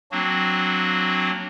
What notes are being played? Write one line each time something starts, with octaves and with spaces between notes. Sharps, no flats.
F#3 A#3 C4 D4 F#4